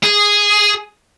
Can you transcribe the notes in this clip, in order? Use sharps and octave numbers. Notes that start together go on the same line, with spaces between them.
G#4